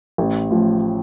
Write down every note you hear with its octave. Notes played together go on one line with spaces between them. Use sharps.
A1
A2 F3